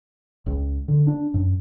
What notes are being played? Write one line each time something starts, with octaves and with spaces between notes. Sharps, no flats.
C#2
D3
D4
F#2